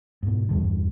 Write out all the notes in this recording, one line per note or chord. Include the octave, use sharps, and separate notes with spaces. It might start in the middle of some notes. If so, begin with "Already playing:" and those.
G#2 B2
E2 G2 D3